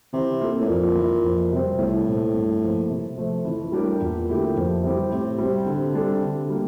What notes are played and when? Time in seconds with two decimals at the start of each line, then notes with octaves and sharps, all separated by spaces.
0.13 C3 E3
0.41 A#3 F4 A4
0.60 A2
0.68 F2 A#2
0.96 E3 A#3 E4
1.24 F2
1.52 C3 G3 C4
1.78 C2 A2
2.06 A#2 A3 C4
2.34 G2
2.62 F3 A#3
2.90 C3
3.18 F3 A3
3.45 F2 E3
3.72 A2 G3 D4 G4 A#4
4.01 E2 A#2
4.28 D3 A3 E4 G4
4.56 F2
4.83 E3 G3 C4 G4
5.11 A2 C3
5.39 G3 C4
5.66 D3
5.95 G3 D4 A4
6.21 D3
6.50 G3 A#3